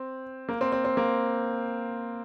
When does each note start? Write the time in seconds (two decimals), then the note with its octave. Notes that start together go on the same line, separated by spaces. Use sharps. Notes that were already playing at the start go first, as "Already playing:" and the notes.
Already playing: C4
0.49 A#3
0.61 C4
0.72 C4
0.85 C4
0.97 A#3